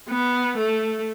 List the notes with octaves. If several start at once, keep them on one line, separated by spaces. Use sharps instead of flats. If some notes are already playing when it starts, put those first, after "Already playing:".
B3
A3